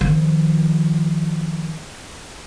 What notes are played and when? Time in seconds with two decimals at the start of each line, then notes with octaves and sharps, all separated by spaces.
0.01 D#3 F3